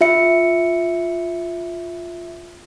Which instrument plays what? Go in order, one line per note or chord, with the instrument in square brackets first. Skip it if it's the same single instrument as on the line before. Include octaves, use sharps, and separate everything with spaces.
[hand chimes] F4 E5 C#7